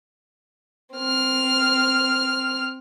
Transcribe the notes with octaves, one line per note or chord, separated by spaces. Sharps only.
C4 F6